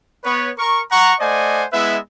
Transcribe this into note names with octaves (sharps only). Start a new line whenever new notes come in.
B3 B4 C#5
A#4 C#6
F#5 A#5 C#6
A3 C5 D5 D#5 F#5 G#5
G#3 B3 E4 B4 E5